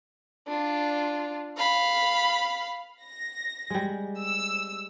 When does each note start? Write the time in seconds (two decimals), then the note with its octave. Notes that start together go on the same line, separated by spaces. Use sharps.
0.48 D4 F4
1.57 F5 B5
3.01 A#6
3.70 G3 G#3
4.19 E6